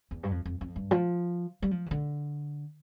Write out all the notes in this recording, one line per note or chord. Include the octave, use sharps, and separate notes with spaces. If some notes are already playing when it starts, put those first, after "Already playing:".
E2
G2
F2
F2
F2
G2
F3
G3
F3
E3
D3